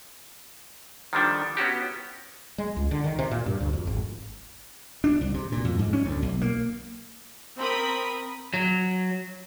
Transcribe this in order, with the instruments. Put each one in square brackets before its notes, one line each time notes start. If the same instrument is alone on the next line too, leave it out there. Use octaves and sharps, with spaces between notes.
[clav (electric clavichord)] D#3 F3 G3 D4 A4
B3 C#4 F#4 G4
[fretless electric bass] G#3
C#2
D3
D#3
C3
A#2
G2
D2
F2
G#1
[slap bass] D4
C2
C3
A#2
F2
G#2
C#4
D2
B1
A#3
[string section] C4 A#4 B5 D#6
[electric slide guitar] F#3